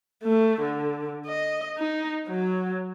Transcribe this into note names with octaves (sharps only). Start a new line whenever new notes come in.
A3
D3
D#5
D#4
F#3